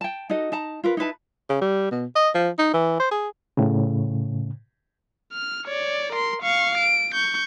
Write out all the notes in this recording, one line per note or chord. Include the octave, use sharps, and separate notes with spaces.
G5 A5
D#4 F#4 A4 D#5
D#4 A5 A#5
F4 A#4 B4
D#4 E4 B4 A5
C#3
G3
B2
D#5
F3
D#4
E3
C5
G#4
A2 C#3
F6
C#5 D5
A#4 C6
F5 C#6
D7
C#6 G6